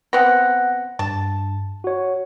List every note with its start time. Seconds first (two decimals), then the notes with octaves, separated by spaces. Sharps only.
0.13 B3 C4 F#5 F#6 A#6
0.99 G2 A5
1.84 F#4 C#5